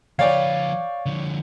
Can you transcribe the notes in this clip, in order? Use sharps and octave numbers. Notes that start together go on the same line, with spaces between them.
F3 B4 C#5 D5 F5 G5
D3 F3